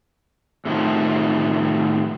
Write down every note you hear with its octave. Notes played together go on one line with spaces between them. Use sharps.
A2 C3 D#3 F3